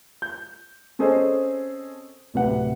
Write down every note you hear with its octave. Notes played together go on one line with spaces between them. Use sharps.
G6
C4 C#4 G#4 A4 C5 D#5
D1 C3 B4 F#5